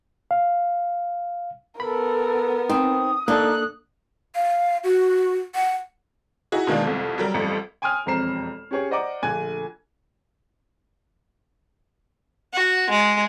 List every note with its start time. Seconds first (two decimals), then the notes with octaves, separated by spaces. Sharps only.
0.31 F5
1.80 B3 A4 A#4 B5
2.69 C4 D#4 D#6
3.28 A#3 D4 D#4 A4 F#6
4.35 F5
4.84 F#4
5.55 F#5
6.52 D#4 E4 F#4 G#4
6.67 B2 D#3 G#3 A#3 D4
6.84 C2 F2
7.18 F#3 G3 A#4
7.34 A1 F2 G3
7.82 G5 G#5 C6 D#6 F6
8.06 E1 F2 C5 A#5 C7 E7
8.71 C#4 G4 G#4 C#5
8.90 C5 D5 D#5 F#5 A#5 D6
9.22 A#1 D3 A3 G#5 F#6 G#6
12.53 F#4
12.89 G#3